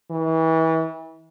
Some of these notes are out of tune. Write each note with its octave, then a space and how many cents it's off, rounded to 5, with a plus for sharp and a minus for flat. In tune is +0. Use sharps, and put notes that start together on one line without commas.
E3 -30